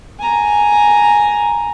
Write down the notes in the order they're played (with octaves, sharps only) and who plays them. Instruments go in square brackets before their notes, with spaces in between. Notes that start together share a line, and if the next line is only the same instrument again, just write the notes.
[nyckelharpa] G#5 A#5